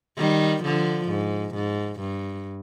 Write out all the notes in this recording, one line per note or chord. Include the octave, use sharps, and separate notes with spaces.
D#3 G3
D3 F3
G#2
G#2
G2